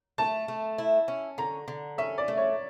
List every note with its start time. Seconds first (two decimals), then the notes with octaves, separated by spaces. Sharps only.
0.18 A3 A5
0.48 A3
0.78 E4
1.08 C#4
1.38 D3 A#5
1.68 D3
1.98 C#4 E5
2.18 D5
2.28 A3
2.37 C#5